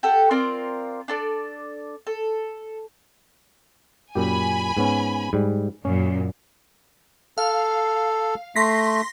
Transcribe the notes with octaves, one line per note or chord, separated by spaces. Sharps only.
G4 A4 F#5
C4 F4 A#4 D5
D4 A4 D5
A4
F#2 A#2 G4 G#5 B5
G#2 B3 C#4
G#2 G3
F#2 A#2 C#4
A4 F5
A3 C6 A#6 B6